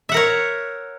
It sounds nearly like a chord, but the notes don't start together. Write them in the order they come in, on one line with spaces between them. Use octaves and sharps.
E5 F#5 A#4 C#5